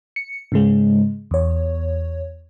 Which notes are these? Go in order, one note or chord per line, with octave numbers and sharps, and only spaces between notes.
C#7
G#2 C#3 G#3
E2 C#5